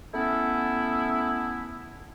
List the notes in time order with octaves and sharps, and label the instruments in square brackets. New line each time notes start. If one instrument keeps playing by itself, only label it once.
[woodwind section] A3 B3 C#4 E4